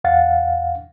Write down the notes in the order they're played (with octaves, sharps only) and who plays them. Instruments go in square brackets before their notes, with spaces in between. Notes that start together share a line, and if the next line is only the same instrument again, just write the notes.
[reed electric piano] E2 F5 F#5 A6